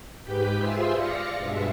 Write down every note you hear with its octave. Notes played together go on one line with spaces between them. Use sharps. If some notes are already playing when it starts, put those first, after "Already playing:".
G#2 G4 B4 G6 B6
F4 G#4 C5 E5 C6 E6
D5 F5 A#6 C#7
G2 B2 G#3 E5